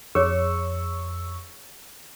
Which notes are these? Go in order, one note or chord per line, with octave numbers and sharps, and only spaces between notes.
F2 G#4 C#5 C#6 E6